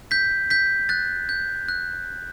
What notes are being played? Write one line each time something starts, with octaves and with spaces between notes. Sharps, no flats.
G6 B6
G6 B6
F#6 A6
G6
F#6